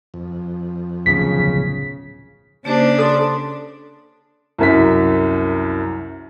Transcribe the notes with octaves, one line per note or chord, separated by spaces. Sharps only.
F2
D1 B1 C#3 F3 B6
C#3 A#3 D4 G4 C5
A4 D5 C6
C2 F#2 B6